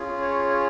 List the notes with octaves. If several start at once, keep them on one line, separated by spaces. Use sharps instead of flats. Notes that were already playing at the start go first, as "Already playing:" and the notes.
Already playing: C#4 F4 G#4
C#5
C#5